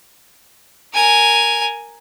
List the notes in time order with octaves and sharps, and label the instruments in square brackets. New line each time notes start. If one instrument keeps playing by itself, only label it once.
[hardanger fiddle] A#4 G#5